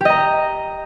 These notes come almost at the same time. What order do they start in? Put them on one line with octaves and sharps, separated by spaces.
G4 D#5 A#5